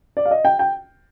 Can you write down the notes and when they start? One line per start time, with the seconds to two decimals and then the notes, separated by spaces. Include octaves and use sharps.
0.17 D5
0.25 F5
0.31 D#5
0.45 G5
0.59 G5